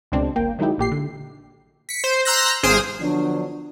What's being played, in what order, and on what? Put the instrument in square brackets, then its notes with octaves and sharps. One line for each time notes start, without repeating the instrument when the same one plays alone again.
[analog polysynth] C#2 B2 G#3 C4 D4
G1 A#3 G5
D#3 F#3 G#3 D#4 E4 G4
A1 A#2 G4 C7
D3
B6 C#7
C5
A#5 C6 E6 F#6 G6 A#6
G#1 G#4 C5 D#6 F6 D7
[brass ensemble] D3 F3 F#3 B3 D4